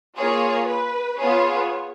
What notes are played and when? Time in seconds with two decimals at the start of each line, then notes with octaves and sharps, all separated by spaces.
0.17 A#3 F4 G#4 C#5
0.68 B4
1.19 B3 F4 G#4 C#5